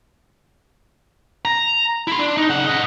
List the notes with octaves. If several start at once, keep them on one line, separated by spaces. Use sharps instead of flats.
A#5
E4 C6
D4
D#4
C#3 F#5
D#5 F#5